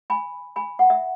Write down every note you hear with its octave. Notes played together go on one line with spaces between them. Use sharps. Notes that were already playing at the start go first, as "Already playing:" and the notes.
G#5 B5
G#5 B5
F#5
E5